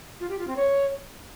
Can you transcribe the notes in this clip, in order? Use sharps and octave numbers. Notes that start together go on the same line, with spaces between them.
F4
G4
F4
C4
C#5